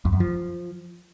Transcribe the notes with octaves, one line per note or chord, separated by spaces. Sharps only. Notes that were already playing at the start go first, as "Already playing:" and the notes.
F2
F#2
F3